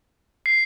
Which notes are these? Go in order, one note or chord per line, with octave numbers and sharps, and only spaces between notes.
C7